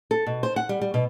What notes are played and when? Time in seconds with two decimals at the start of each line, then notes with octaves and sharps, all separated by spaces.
0.11 A4
0.27 B2
0.43 C5
0.56 F#5
0.69 G3
0.81 G3
0.94 B2